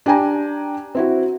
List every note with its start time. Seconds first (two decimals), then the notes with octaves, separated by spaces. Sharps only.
0.06 D4 G4 G5 G#5 A#5
0.95 C4 E4 F#4